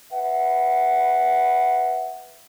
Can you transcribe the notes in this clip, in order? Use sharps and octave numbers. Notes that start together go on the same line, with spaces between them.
B4 E5 F#5